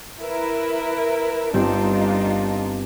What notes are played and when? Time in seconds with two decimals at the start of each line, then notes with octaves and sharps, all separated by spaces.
0.20 E4 A#4 B4
1.54 G1 C4 D4 D#4 F4 G4